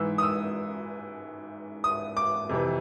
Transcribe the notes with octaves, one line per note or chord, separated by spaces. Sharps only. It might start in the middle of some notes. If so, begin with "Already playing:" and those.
Already playing: G#2 E3 E6
D#6
E6
D#6
D6
F2 C3 E3